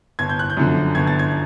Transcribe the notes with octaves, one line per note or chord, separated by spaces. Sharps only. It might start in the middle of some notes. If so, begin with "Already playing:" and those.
G1 G#6
G6
F#6
G6
F#2 D3 F3
G1 G#6
A6
G#6